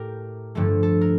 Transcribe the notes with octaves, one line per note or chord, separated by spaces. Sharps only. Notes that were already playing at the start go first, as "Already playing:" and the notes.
Already playing: A2 A3 G4 A#4
G2 D3 F3 A3 A4
A4
A#4